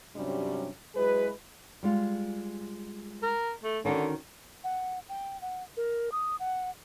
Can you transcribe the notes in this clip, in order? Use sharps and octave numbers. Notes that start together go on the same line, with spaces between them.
G2 C3 F#3 G3 C#4 D4
F#3 G#3 E4 G#4 B4
G3 G#3 F4
A#4
A3
D3 D#3 C#4 F#4
F#5
G5
F#5
A#4
D#6
F#5